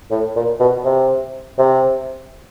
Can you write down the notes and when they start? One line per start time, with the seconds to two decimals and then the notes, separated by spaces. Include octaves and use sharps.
0.11 A2
0.36 A#2
0.60 B2
0.85 C3
1.59 C3